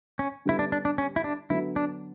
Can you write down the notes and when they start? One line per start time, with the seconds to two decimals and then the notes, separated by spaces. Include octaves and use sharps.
0.19 C#4
0.45 D3 G3 B3 E4
0.59 D4
0.72 D4
0.85 D4
0.98 C#4
1.16 E4
1.24 D4
1.50 D3 F#3 B3 E4 F#4
1.76 D4